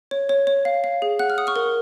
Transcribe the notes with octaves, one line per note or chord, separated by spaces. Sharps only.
C#5
C#5
C#5
F5
F5
G#4
F#5 F#6
F6
F#5 D#6
C#6 F6
A#4